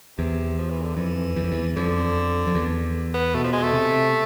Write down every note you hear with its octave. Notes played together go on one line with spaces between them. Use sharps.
E2 C3
F3
E3
D3
F2 E3
E2
F2
E2
F2 D3
F2
E2
B3
B2 A3
F3
G#3
A3
C3